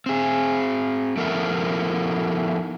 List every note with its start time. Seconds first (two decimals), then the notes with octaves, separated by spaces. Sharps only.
0.06 C4 G#4
1.17 F3 B3 D#4 E4 A4 A#4